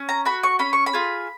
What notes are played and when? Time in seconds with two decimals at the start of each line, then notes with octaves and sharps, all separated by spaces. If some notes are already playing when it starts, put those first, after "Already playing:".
Already playing: C#4
0.09 A#5
0.25 F#4 B5
0.43 C#6
0.59 C#4 B5
0.73 C#6
0.86 B5
0.93 F4 G#4